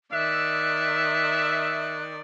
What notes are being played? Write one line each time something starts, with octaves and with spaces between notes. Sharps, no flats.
D#3 D5 E5 F#6